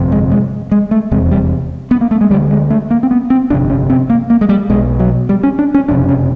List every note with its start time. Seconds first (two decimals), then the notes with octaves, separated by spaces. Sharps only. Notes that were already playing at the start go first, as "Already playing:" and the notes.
Already playing: G1 F2 C3
0.12 G#3
0.32 G#3
0.72 G#3
0.91 A3
1.11 F1 E2 C3 G#3
1.31 G3
1.91 B3
2.01 A#3
2.11 A3
2.21 G#3
2.30 D2 G3
2.34 D3
2.51 G#3
2.70 A3
2.91 A#3
3.03 C4
3.11 B3
3.30 C4
3.50 G1 F2 C3 D4
3.70 C#4
3.90 C4
4.10 A#3
4.30 A#3
4.41 G#3
4.49 G3
4.69 B1 B2 G#3
4.99 F#3
5.29 G3
5.43 C#4
5.59 D4
5.74 C#4
5.88 F#1 F2 C3 D4
6.09 C#4